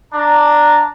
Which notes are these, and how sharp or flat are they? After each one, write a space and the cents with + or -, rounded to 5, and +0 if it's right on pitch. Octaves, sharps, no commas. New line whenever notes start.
D4 +0 A#5 -10